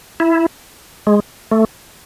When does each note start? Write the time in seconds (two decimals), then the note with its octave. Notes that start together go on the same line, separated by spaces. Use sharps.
0.20 E4
1.07 G#3
1.51 A3